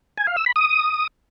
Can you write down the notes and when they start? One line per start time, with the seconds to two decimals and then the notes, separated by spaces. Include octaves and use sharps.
0.18 G#5
0.27 F5
0.37 E6
0.46 B5
0.56 D#6